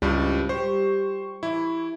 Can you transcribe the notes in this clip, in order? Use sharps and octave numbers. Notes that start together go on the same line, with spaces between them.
C#2 G2 F3 G3 E4 G4
G3 G4 C5 C#6
E3 E4